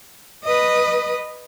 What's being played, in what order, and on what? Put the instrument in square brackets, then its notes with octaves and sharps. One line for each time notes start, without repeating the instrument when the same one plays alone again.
[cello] B4 D#5